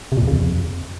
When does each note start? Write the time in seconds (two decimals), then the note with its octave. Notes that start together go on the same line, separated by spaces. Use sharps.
0.12 C3
0.17 A#2
0.22 E2
0.27 C#3
0.33 F2